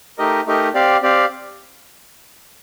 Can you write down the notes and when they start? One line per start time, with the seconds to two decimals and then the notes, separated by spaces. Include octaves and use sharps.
0.18 A3 D#4 G4 A#4 D#5
0.46 A3 D#4 G4 A#4 D#5
0.74 C4 G4 D5 F5
1.02 C4 G4 D5 F5